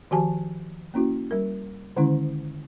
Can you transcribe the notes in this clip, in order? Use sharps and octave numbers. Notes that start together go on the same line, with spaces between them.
D#3 F3 F#4 G4 G#5 A5
A#3 C#4 E4 F#4
G3 A#4
D3 D#3 G#3 C#4 E4